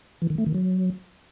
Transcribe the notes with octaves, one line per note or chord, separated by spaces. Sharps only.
E3
D#3
A3
D#3
F#3